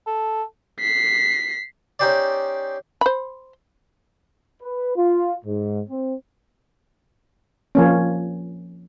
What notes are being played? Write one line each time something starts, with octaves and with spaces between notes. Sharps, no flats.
A4
B6 C7
C#4 D#4 G4 C5 D5
C5 B5
B4
F4
G#2
C4
F3 A#3 C#4